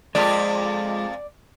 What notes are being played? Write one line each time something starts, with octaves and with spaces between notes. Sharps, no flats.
F2 G#3 A#3 F4 D5 D#5